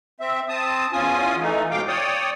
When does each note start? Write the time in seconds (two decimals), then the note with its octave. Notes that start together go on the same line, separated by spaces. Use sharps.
0.20 C4 E5
0.49 C4 A5 D#6
0.93 E2 C#4 F4 G#5 D#6
1.41 E3 A3 D#4
1.71 G#2 B2 F5 G5 D6
1.88 C#5 D5 G5 D#6